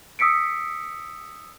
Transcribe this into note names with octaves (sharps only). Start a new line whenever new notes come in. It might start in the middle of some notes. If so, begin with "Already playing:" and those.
D#6 E6 B6 C#7 D7